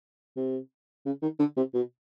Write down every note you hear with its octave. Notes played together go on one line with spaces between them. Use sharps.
C3
C#3
D#3
D3
C3
B2